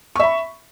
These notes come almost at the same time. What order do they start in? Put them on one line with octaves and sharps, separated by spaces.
C#6 E5 B5